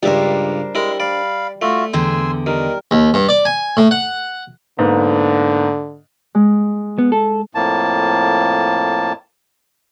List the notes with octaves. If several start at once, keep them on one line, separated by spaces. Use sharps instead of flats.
C#2 G2 G3 D4 A#4 C5 E5
G3 G#3 E4 A#4
D5 F5 B5
A3 F4 F#4 E5
E2 D3 G5 G#5 C6 E6
D#3 G3 A#4
D#2
G2
D5
G#5
A2
F#5
G#2 D3 A#3 B3
G#3
B3
A4
F2 A2 A#3 A5